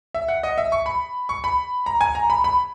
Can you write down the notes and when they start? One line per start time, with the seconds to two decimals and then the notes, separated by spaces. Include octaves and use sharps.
0.14 E5
0.28 F#5
0.43 D#5
0.58 E5
0.72 C#6
0.86 B5
1.29 C#6
1.44 B5
1.86 A#5
2.01 G#5
2.15 A#5
2.30 B5
2.44 B5